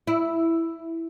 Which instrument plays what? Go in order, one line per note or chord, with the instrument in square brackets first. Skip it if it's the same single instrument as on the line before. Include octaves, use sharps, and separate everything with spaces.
[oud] E4